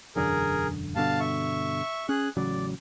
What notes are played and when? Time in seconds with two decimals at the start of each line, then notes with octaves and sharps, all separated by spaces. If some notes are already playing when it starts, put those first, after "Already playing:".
0.16 E1 F#2 D3 G#4 A#4
0.96 G2 B2 D3 F5 A5
1.20 E5 C#6
2.09 C#4 G#4 F#6
2.37 A1 C#3 F#3 D5